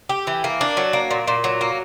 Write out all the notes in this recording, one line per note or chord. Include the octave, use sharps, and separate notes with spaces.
G4
E3
A#3
D4
F#3
A#3
A#2
A#2
F#3
A#3